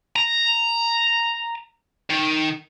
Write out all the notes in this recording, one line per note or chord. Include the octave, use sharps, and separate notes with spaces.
A#5
D#3